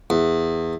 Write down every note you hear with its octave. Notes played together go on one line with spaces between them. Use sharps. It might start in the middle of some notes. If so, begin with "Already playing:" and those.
E2